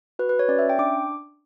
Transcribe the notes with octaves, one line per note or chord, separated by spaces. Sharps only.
F#4 B4
B4
F#4
C#5
C#4 D5
E5
C#4
G5
D4 D6